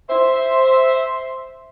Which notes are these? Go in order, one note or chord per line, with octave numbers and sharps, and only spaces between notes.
C5 E5